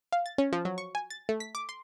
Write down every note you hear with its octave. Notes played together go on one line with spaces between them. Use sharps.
F5
A6
C#4
F3
F#3
C#6
G#5
A6
A3
B6
D6
C6